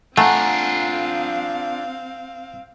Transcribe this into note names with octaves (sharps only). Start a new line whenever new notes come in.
A3 C4 D4 F4 F5 F#5 G#5 A#5